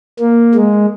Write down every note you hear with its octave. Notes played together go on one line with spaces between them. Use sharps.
A#3
G#3